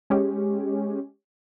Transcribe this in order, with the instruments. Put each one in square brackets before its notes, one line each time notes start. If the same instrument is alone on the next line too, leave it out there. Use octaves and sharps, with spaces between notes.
[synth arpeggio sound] G#3 C#4 G4